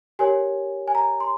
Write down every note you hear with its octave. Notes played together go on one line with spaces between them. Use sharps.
G4 A#4 C#5 G#5
G#5
A#5
C6